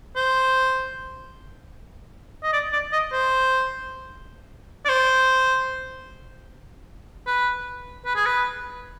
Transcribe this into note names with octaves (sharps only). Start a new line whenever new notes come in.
C5
D#5
D5
D5
D#5
C5
D5
C5
B4
B4
G#4
B4